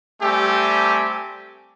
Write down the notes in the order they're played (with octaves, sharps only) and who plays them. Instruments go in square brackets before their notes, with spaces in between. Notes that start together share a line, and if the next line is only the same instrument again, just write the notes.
[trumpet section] G3 A3 C4 G4 G#5